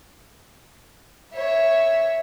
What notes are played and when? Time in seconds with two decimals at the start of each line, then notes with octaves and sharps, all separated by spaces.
1.35 C#5 E5